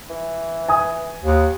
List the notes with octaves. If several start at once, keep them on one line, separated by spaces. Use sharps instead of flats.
E3
G#5 D#6
D#2